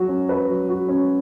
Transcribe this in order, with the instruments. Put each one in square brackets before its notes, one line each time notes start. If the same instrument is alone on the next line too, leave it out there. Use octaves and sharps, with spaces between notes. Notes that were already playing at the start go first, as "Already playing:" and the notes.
Already playing: [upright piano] F#3 F#4
C#4
B4
F#3
F#4
C#4